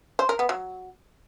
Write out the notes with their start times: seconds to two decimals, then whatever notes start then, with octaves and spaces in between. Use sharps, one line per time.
0.19 C5
0.29 A#4
0.39 B3
0.49 F#3